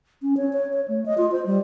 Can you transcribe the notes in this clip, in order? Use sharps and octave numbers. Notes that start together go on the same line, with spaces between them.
C#4
C#5
C#5
C#5
A3
D#5
F4
C5
G3